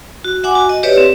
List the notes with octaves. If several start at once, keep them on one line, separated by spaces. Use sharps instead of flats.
F#4
E5 F#5 G#5 D6
F#4
D#5
G4 B4 C#5 D5 E5
C4